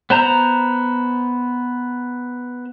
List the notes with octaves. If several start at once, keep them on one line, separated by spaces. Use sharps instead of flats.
B3 C5 A#5 G6